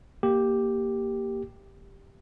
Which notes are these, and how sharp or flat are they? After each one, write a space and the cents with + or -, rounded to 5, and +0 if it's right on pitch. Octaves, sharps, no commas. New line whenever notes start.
A#3 +0 G4 +0